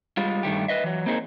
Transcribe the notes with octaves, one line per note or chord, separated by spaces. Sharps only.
G3 G#3 F4
G2 D#3 A3 G4
B4 D#5 E5
E3 F#3
A#3 C4 D#4 G#4 A#4